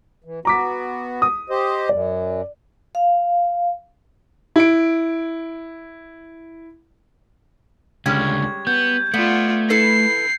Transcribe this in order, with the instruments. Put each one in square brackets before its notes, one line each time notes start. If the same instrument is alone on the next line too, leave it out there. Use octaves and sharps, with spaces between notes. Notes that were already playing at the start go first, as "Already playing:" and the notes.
[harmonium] E3
[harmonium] B3 F#4 [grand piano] A#5 D6 B6
[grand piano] D#6
[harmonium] G4 C5 D#5
[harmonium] F#2 [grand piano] D5
[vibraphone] F5
[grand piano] E4 D7
[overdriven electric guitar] C#2 D3 [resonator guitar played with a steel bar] G3 G#3 C#4 [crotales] G#6
[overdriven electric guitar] B3 [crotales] G6
[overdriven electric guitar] A3 [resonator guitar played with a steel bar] B3 [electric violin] F4 D5 [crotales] C#7
[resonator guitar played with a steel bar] E4 A4 B4 [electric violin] C7